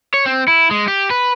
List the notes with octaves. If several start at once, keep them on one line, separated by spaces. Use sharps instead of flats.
C#5
C4
E4
G#3
G4
B4